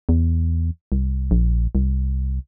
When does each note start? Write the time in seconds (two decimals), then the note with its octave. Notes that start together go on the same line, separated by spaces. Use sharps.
0.09 E2
0.92 C2
1.31 A#1
1.75 C2